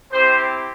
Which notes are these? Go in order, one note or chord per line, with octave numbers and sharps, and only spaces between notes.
C4 E4 G4 C5